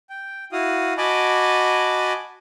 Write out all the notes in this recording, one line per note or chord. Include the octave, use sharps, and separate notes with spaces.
G5
E4 F#4 F5 D#6
F#4 D#5 G#5 A5 B5 D6